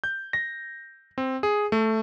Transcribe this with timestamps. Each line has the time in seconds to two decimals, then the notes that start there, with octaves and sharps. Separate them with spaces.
0.04 G6
0.33 A#6
1.18 C4
1.43 G#4
1.72 A3